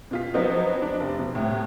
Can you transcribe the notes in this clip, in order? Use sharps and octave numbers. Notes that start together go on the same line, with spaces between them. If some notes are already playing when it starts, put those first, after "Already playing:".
B2 F4 B6
F3 F#3 B3 C4 D#4 F#4
D4
F1
B2
C2 A2